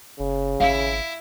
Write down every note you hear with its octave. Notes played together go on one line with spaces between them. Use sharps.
F#1 C#3
G#1 E4 F5